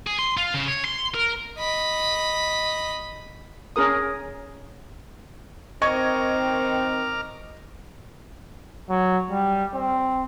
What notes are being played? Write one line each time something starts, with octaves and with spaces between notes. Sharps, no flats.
G#4
C6
F4
C#3
C#5
C6
A#4
D#5 B5
C#4 G#4 A#4 D#6
D#3 C4 A#4 D#5 C#6 D6 F6 G#6
F#3
G3
C4